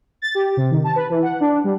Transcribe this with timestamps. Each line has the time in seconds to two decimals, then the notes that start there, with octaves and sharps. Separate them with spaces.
0.22 A6
0.35 G4
0.57 C3
0.71 D#3
0.84 A5
0.96 B4
1.10 E3
1.22 F#5
1.40 D4
1.64 G3